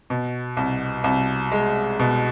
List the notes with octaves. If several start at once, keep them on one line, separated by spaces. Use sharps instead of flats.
B2
C2
C2
G#3
B2